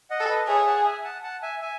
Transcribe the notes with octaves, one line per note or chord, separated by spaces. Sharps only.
D#5 F#5
A4
B4 D#5
G#4 C#5 E5
F#5 A5
E5 G#5
F#5 A5
F#5 A5
E5 G#5
E5 G#5